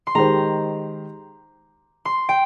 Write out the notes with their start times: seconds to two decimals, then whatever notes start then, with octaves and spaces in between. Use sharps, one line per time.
0.07 C6
0.15 D#3 G#3 D#4 G4 C5 A#5
2.05 C6
2.29 G5